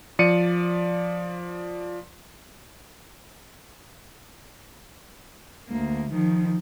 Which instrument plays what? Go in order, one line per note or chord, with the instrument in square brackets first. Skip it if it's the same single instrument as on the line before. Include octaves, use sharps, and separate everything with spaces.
[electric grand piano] F3 D5 C#7 D#7
[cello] D2 A#3
D#3 F3